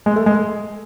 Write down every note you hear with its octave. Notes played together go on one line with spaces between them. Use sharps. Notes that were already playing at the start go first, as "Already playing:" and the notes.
G#3
A3
G#3